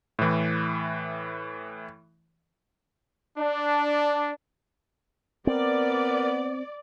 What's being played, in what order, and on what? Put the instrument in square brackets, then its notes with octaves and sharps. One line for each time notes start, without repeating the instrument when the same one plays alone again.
[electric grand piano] A2 E3
[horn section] D4
[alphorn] B3 [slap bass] C4 [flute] A#4 [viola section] D5